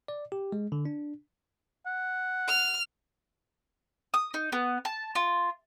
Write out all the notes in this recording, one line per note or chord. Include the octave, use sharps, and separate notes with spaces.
D5
G4
G#3
D3
D4
F#5
F6
D#6
D#4
B3
A5
F4